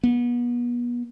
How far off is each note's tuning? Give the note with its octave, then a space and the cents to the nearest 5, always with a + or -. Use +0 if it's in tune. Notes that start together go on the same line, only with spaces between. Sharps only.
B3 -35